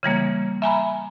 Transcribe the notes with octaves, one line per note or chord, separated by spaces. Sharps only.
C#3 E3 G3 A#3
E5 G#5 A#5 B5